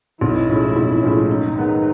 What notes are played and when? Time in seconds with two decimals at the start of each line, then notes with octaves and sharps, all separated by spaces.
0.21 B1 E4
0.49 A2 F3 G#3 C#4
0.76 B1
1.03 A2 F3 G#3 C#4
1.29 F#2 D#4
1.56 D#3 G#3 B3